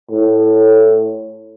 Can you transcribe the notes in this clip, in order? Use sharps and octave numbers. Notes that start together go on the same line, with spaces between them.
A2